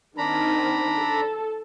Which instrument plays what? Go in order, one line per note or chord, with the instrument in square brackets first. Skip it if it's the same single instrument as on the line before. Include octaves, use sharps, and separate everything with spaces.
[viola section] D#3 C4 [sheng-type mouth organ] D4 A#5 B5
[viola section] A4